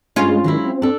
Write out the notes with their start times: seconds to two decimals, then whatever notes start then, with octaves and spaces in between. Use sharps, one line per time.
0.16 G2 G#3 C#4 F4 D#5
0.44 D#3 F#3 G#3 E4
0.64 C4
0.82 D4 A4